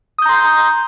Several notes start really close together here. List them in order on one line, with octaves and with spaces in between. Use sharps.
D#6 G6 A#5 C6